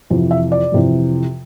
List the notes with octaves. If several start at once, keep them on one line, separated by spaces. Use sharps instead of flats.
F2 C3 E3
E5
D5
F2 C3 E3